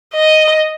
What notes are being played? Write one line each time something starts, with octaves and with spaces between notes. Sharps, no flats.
D#5